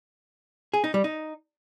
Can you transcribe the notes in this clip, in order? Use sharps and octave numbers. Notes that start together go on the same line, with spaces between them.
G#4
D#4
G3
D#4